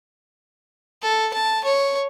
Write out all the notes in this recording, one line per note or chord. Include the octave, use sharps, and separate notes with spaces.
A4
A5
C#5